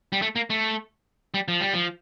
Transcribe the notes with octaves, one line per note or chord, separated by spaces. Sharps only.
G3
A3
A#3
A3
G3
F3
G3
F3